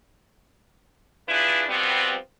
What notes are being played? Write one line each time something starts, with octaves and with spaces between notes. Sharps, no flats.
E3 D4 E4 F4 G#4 B4
B2 F3 G3 B3 C4